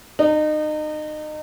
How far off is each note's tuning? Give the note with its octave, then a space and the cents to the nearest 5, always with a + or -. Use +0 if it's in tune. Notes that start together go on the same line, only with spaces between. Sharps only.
D#4 -30